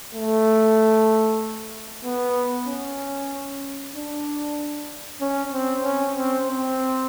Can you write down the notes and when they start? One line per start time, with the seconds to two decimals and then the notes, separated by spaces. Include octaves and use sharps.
0.15 A3
2.04 B3
2.67 C#4
3.94 D4
5.20 C#4
5.52 C4
5.83 C#4
6.16 C4
6.47 C4